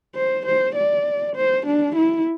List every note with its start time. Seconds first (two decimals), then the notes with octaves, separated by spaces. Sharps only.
0.15 C5
0.46 C5
0.75 D5
1.36 C5
1.66 D4
1.95 E4